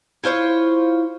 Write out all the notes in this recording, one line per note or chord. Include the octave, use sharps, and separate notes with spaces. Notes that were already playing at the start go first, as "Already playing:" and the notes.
E4 F4 C5 C#5